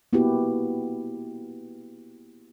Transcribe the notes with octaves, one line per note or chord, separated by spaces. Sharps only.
A#3 B3 E4 F#4 G4 B4